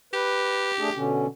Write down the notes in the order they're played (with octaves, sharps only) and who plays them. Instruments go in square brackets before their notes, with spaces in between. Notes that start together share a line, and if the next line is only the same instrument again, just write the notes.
[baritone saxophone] G4 [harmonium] B4
[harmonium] A3 D4 G#4
B2 D3 C#4